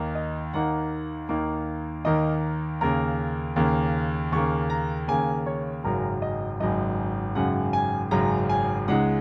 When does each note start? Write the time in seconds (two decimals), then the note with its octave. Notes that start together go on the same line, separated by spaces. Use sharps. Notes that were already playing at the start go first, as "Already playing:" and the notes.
Already playing: D#2 D#3 A#3 D#4
0.15 D#5
0.53 D#2 D#3 A#3 D#4 F#5
1.29 D#2 D#3 A#3 D#4
2.05 D#2 D#3 A#3 D#4 D#5
2.81 D#2 C#3 A#3 A#4
3.56 D#2 C#3 A#3
4.32 D#2 C#3 A#3 C#6
4.70 A#5
5.08 D#2 C#3 A#3 G#5
5.46 C#5
5.84 G#1 F#2 C#3 F#3 A#4
6.22 D#5
6.60 G#1 F#2 C#3 F#3 D#5
7.35 G#1 F#2 C#3 F#3 F#5
7.73 G#5
8.11 G#1 F#2 C#3 F#3 A#5
8.49 G#5
8.88 C#2 C#3 G#3 D#4 F#5